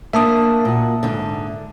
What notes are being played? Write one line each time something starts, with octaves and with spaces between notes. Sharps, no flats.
A#3 D4 E5 A5 D#6
A#2 F#4
G#2 D3